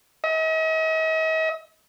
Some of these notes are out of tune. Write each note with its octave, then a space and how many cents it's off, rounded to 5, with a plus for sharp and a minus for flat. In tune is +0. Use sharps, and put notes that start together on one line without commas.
D#5 +45